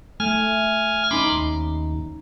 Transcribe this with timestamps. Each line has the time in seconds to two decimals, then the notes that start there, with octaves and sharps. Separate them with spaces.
0.20 A3 G#5 F6
1.11 C#4 D#4 B5 C6 D6
1.32 D#2